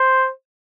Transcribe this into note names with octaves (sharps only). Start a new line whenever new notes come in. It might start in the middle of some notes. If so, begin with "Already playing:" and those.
Already playing: C5